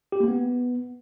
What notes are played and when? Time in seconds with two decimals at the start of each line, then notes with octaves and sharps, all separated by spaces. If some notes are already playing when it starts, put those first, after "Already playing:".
0.12 G4
0.20 A#3
0.28 B3